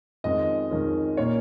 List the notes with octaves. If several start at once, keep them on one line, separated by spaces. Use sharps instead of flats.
F2 D#3 G#3 C#4 D#5
F2 D#3 G#3 C#4
A#2 A#3 C#4 C#5